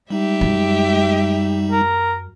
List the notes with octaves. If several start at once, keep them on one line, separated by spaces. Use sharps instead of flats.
G3 G#3 D#4 G4 E5
F#2
A#4